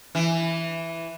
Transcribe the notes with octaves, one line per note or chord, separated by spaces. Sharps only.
E3